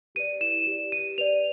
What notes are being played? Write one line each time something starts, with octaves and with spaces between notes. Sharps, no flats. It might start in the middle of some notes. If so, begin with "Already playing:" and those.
G4 B4 D5 D#7
E4 E7
G4 B4 D5
G4 D#7
B4 D5 F7